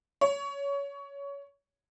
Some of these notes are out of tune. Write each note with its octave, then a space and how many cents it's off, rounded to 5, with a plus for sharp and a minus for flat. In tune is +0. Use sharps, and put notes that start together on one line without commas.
C#5 +20